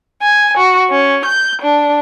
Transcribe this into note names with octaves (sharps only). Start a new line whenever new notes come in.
G#5
F#4
C#4
G6
D4